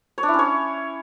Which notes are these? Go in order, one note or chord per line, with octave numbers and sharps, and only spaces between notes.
C#5
D4
E4
C#4
C#5